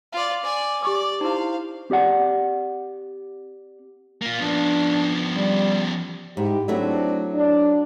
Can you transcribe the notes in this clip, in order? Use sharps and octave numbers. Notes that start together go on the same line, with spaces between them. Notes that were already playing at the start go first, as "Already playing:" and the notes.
F4 D5
D5 G#5
G4 D5 C#6 D6
D#4 E4 C5 F5
C4 G4 D5 F#5
A#3 F4
F3 B3 D4
G3
G#2 G#3 E4 G4
F#3 A3 C4 D4 E4
D4